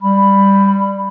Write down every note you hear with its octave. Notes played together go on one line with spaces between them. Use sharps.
G3 B5